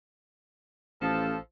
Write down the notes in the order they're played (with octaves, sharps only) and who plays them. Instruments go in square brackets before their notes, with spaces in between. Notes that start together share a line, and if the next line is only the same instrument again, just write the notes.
[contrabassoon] A1 [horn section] F3 A4